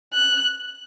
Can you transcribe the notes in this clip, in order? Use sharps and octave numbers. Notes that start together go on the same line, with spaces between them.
F#6